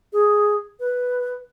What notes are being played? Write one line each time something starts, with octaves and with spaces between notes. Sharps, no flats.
G#4
B4